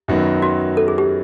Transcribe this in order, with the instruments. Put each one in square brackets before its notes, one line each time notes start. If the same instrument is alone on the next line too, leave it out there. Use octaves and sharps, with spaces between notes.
[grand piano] F#2 D#3 F#3 B3
[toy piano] F#4
A4
G#4
G4